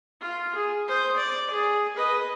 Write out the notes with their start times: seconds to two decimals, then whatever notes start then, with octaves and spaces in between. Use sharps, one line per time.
0.21 F4
0.55 G#4
0.87 C5 D#6
1.17 D5
1.50 G#4
1.96 B4 D#5